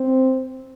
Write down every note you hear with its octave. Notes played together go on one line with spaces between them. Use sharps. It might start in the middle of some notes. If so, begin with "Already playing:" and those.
Already playing: C4